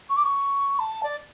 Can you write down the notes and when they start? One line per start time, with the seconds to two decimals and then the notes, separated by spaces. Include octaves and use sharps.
0.09 C#6
0.16 D6
0.23 C#6
0.79 A5
1.03 D5